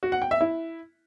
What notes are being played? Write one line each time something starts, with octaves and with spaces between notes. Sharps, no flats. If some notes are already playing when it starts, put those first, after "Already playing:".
F#4
F#5
G5
E5
E4